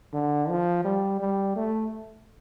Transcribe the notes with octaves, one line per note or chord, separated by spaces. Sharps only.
D3
F3
G3
G3
A3